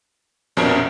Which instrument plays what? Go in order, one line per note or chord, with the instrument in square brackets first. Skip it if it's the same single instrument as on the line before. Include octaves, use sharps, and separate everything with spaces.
[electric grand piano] A#1 F2 B2 [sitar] G3 C#4 A#4